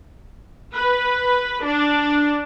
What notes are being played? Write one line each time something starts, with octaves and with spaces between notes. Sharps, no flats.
B4
D4